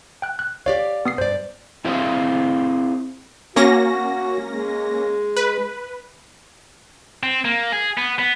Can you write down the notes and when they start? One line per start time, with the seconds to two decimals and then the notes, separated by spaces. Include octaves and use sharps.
0.22 G5 F#6
0.39 F#6
0.66 G4 C#5 D5 F5
1.05 B3 D#6 C7
1.18 G2 C5 D5
1.85 C4 E4 G#4 C5 D#5 F5
3.56 A#3 C#4 F#4 A#6
4.49 G#3
5.37 B4
7.23 C4
7.45 A#3
7.72 G#4
7.97 B3
8.19 B3